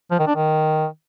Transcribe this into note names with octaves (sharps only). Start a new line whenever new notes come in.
F3
D#3
D4
D#3